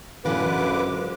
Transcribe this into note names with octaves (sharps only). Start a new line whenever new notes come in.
F#2 A2 D3 E3 B3 B4 F5 D6
F3 G#3